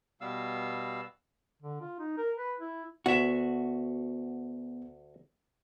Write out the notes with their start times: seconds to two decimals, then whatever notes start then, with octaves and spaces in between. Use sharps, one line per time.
0.21 B2 G3 B3 F5 E6
1.62 D3
1.81 F4
1.99 D#4
2.18 A#4
2.37 B4
2.59 E4
3.06 D2 B3 F#4 E5